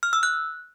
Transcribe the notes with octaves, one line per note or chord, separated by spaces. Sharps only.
F6
E6
F#6